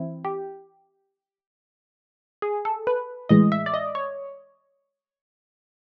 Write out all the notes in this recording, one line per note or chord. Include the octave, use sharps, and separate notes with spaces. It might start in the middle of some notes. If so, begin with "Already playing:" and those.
Already playing: E3 C4 E4
G4
G#4
A4
B4
A2 E3 G#3 D#5
E5
D5
D#5
C#5